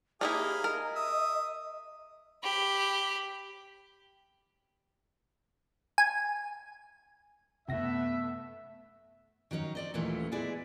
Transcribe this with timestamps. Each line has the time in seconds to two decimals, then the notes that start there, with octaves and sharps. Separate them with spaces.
0.21 A#3 D#4 E4 G4 G#4 F5
0.64 A#4 D#5
0.96 E5 D#6
2.43 G4 B5
5.98 G#5
7.69 F#2 C3 A3 B3 E5 A#6
9.51 D#3 F#3 C#4 D#4
9.75 C4 D5 D#5
9.94 D#2 A#2 E3 F#3 A3 C#4
10.32 G#3 B3 E4 G#4 D5